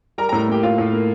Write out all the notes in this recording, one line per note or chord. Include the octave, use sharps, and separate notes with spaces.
G3 A#4 A#5
A2 A#4 A#5
A#3 G4 G5
A2 F4 F5
A2
A#3